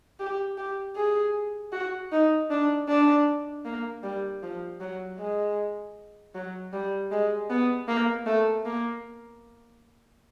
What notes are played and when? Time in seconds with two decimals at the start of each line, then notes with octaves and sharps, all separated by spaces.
0.20 G4
0.58 G4
0.96 G#4
1.73 F#4
2.12 D#4
2.50 D4
2.88 D4
3.66 A#3
4.03 G3
4.43 F3
4.81 F#3
5.19 G#3
6.35 F#3
6.73 G3
7.11 G#3
7.51 B3
7.88 A#3
8.27 A3
8.66 A#3